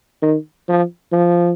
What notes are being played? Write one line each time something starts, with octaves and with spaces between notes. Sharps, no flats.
D#3
F3
F3